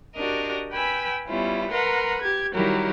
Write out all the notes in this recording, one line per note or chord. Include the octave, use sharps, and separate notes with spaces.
D4 F#4 G4 A#4 D#5
B4 G5 G#5 B5 E6
G3 B3 C#4 E4 F4
A#4 B4 F#5 A#5 C6
G4 G#6
D#3 F#3 G3 E4 G4 A#4